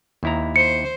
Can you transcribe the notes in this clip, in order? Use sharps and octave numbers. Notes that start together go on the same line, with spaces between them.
D#2 E4 A#5
C5 C#7